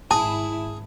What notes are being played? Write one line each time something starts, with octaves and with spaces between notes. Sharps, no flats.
G#1 E4 G#4 A5